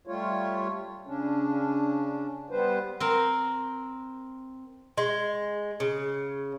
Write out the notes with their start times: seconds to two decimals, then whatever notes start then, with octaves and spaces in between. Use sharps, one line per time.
0.07 G3 A3 F4 C#5
1.07 C#3 C#4 D4
2.50 G3 B3 B4 C5
3.00 C4 A#4
4.98 G#3
5.80 C#3